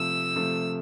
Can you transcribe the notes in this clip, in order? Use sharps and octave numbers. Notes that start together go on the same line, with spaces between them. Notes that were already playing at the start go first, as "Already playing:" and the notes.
Already playing: C3 F3 A3 E6
C3 F3 A3